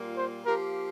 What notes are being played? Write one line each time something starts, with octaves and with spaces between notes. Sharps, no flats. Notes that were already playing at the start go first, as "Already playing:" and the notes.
Already playing: A#2 G3 A#3 F4
C5
F3 A#3 G4 A#4